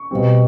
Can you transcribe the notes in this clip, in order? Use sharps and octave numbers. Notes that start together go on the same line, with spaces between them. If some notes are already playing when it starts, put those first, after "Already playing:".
Already playing: C#6
B2 G3 C4